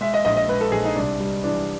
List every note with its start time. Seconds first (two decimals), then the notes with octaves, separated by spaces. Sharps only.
0.01 G#3 E5
0.14 D#5
0.25 A#1 D#5
0.37 D#5
0.48 G#3 B4
0.61 A4
0.72 A#1 G#4
0.85 D#4
0.96 C2 D4
1.20 G3
1.44 E3 D4